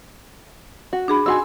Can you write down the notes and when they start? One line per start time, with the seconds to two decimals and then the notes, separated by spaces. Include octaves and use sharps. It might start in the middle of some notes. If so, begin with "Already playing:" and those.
0.93 F#4
1.08 D4 G#4 B5
1.26 D#4 F#4 G#5 C6 E6